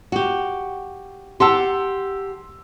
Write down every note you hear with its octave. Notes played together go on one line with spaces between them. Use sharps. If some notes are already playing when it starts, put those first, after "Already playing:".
F#4 G4
G4 F#5 A5 C6 E6